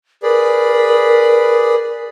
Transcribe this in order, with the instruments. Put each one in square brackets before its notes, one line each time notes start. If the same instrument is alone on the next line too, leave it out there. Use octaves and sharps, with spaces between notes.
[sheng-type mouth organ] G#4 B4 D5 [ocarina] A#4